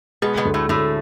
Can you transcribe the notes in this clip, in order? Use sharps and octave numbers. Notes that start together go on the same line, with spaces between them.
B2 G#3 B3
B2 B3
D2
A2 A3
D2 A2 A3